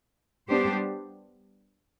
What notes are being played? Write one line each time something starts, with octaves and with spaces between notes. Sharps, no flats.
G3 B3 D4 G4 C5